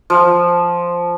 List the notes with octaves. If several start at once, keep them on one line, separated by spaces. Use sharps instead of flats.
F3